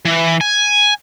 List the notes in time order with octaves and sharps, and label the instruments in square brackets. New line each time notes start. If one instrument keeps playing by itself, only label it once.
[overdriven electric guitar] E3
G#5